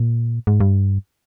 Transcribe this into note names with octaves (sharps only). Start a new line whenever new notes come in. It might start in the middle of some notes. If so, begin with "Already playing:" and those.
Already playing: A#2
G#2
G2